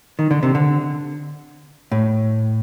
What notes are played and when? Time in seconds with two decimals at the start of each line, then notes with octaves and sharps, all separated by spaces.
0.19 D#3
0.31 D3
0.43 C3
0.55 D3
1.92 A2